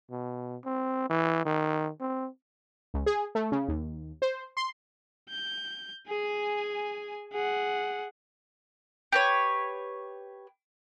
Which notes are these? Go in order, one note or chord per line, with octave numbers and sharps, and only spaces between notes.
B2
C4
E3
D#3
C4
C#2
G#4
A3
C#3
D#2
C5
C6
G6
G#4 G#5
G#4 F#5
G4 B4 C#5